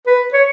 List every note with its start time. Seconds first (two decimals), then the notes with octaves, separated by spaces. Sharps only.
0.07 B4
0.33 C#5